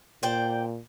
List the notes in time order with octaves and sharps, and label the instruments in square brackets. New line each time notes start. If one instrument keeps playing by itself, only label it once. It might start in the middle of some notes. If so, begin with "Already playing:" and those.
[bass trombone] A#2 [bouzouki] C5 D5 G5